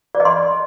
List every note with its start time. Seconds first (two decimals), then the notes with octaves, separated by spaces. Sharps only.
0.15 D5
0.20 D#5
0.25 C6